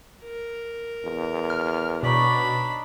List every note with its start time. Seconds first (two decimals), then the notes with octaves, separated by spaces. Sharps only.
0.24 A#4
1.04 E2
1.50 F6
2.03 B2 D4 D#4 C#5 D5 B5